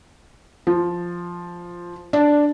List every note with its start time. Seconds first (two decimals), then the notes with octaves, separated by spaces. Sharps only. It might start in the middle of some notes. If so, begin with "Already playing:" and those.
0.67 F3
2.13 D4